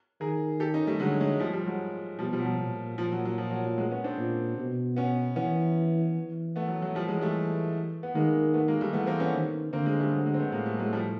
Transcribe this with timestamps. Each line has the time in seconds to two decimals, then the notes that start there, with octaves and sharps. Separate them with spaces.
0.21 D#3 G#4 A#4
0.60 G4 A4
0.74 C#4 D#4
0.87 G3 A3
1.00 D3 F#3 G#3
1.21 F#3 G#3
1.40 F3 G3
1.53 F3 G3
1.66 F#3 G#3
2.19 B2 F3 G3
2.33 F3 G3
2.40 F#3
2.46 F3
2.59 A#2
2.98 A#2 F3
3.12 F#3
3.25 F#3
3.38 F3
3.51 F#3
3.65 F#3
3.78 F#3 G#3
3.91 B3 C#4
4.04 C4 D4
4.18 A#2
4.58 B2
4.96 B3 C#4
5.36 E3 B3 C#4
6.16 E3
6.56 A3 B3
6.68 F#3
6.82 F#3
6.95 E3 F3 G3
7.08 F#3 G#3
7.21 G3 A3
8.03 B3
8.15 D#3 G#3 A#3
8.54 A3 B3
8.68 G#3 A#3
8.81 G3 A3
8.93 E3 A3 B3
9.07 A#3 C4
9.20 B3 C#4
9.33 D#3
9.73 D3 A#3 C4
9.86 G#3 A#3
10.00 G3 A3
10.13 F#3 G#3
10.26 F#3 G#3
10.34 C4
10.39 A3 B3
10.52 A2 G#3 A#3
10.65 G3 A3
10.79 F#3 G#3
10.93 F3 G3